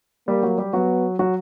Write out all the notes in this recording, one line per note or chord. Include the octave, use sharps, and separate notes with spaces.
G3 A#3 G4
F#3 F#4
G3 G4
F#3 B3 F#4
F#3 F#4